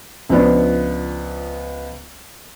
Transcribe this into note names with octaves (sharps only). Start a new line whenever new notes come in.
C#2 F3 B3 D4